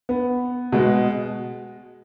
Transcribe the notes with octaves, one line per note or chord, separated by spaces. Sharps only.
B3
B2 G#3